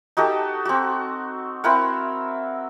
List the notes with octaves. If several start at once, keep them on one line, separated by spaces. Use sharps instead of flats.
D#4 F#4 G4 A4
C4 F#4
C4 E4 A#4 F#5